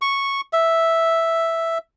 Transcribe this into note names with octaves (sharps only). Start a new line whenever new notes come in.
C#6
E5